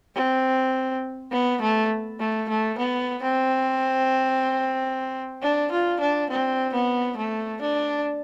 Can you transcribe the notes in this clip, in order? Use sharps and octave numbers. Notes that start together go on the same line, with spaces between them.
C4
B3
A3
A3
A3
B3
C4
D4
F4
D4
C4
B3
A3
D4